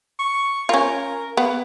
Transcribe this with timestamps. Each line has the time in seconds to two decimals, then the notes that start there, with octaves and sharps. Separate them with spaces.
0.19 C#6
0.69 C#4 F4 A#4
1.37 B3 F5